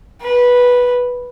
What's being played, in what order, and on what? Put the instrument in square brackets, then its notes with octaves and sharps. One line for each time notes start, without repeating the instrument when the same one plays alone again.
[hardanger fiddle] B4